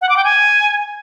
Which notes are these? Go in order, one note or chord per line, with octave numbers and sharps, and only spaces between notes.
F#5
D6
G5
G#5